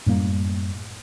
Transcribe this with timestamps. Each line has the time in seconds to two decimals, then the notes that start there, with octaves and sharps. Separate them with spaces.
0.06 F#2 A2 G3 A#3